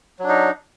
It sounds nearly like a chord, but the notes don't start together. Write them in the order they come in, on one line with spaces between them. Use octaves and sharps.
F#3 D4 D#4